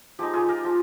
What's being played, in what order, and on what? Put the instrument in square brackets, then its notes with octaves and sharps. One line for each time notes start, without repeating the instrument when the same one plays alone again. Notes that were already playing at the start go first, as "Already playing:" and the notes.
[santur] F3 G#3 D#4 G4
F4 G#4
G4 A#4
F3 G#3